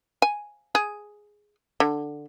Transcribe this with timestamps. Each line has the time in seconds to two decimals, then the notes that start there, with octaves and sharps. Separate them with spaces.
0.22 G#5
0.75 G#4
1.80 D3